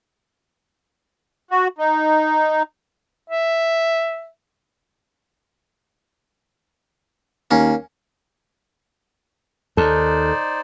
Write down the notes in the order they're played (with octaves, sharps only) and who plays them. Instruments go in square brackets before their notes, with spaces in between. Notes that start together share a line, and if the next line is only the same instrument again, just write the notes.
[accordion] F#4
D#4
[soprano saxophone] E5
[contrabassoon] D#2 [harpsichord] A#3 C#4
[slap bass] D#2 [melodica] D#4 C5 D5 [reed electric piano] A4